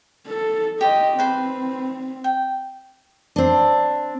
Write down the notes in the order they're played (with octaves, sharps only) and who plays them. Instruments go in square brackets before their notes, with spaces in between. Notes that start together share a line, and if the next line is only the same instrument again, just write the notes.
[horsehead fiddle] A4
[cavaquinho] G4 C5 [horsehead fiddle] D#5
[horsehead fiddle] C4 [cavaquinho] B4 C5
[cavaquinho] G5
[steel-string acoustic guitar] C4 D4